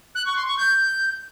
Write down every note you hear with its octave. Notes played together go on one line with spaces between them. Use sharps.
F#6
C#6
C6
C#6
G6